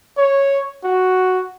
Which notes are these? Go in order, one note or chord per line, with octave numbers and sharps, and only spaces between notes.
C#5
F#4